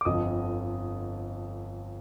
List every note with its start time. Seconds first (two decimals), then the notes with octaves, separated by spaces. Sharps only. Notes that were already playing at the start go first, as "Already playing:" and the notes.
0.01 D6
0.05 G1 F2 D3 F3 D#5 D#6